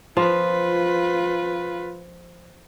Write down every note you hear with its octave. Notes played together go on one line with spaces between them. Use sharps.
F3 F4 B4